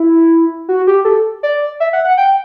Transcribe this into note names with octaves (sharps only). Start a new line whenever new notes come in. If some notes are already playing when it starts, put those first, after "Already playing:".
Already playing: E4
F#4
G4
A4
D5
E5
F#5
F#5
G5